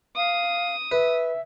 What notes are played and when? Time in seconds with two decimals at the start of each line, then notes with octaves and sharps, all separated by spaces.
0.17 F5 D#6
0.92 B4 E5